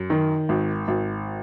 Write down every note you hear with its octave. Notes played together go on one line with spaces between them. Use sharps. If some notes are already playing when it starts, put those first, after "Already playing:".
Already playing: F#2
D#3
G#1
G#1